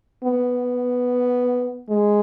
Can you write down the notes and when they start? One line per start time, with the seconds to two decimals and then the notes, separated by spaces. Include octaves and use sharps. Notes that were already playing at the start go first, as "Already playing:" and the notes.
0.24 B3
1.90 G#3